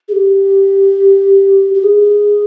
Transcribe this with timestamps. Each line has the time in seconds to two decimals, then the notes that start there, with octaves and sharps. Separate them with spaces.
0.08 G#4
0.12 G4
1.74 G4
1.84 G#4